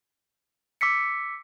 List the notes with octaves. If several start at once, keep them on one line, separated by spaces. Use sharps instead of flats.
D6 E6 B6 C#7